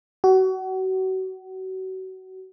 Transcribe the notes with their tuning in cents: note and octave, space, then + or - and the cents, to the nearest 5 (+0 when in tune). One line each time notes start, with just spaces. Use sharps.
F#4 +30